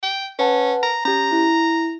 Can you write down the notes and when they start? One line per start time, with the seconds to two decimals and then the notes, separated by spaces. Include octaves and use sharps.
0.03 G5
0.39 C#4 B4 F#5 A5
0.83 A#5
1.05 C#4 G4 A#5
1.32 E4